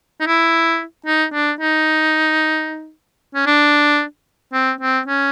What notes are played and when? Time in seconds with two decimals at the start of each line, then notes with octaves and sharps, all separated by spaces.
0.20 D#4
0.27 E4
1.06 D#4
1.33 D4
1.60 D#4
3.35 C#4
3.46 D4
4.53 C4
4.81 C4
5.07 C#4